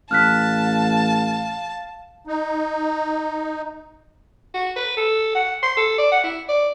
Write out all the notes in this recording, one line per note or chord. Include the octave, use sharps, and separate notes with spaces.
A1 F5 A5 F6 F#6 B6
D#4
F#4
B4
A4
F#5
C6
A4
D5
F#5
E4
D5